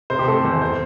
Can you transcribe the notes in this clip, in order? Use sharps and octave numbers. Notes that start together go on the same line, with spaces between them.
C3 C5
G4
A3 A4
E2 C5
C5